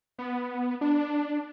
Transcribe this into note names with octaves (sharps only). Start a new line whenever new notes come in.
B3
D4